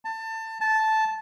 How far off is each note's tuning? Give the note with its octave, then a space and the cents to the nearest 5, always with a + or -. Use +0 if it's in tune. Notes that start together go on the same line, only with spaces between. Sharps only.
A5 +25
A5 -10